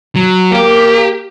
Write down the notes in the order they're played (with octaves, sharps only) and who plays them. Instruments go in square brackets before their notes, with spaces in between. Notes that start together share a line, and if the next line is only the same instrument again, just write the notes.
[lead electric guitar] F#3
[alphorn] A#3 [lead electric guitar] G4